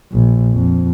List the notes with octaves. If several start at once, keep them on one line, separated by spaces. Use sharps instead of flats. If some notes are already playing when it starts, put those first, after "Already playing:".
A#1
F2